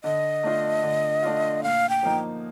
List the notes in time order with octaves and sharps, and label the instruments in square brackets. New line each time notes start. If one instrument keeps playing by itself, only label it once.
[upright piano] D3 [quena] D#5
[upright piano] A3 D4 F4
D3
A3 D4 F4
[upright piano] A#2 [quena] F5
[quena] G5
[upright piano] F3 A#3 D#4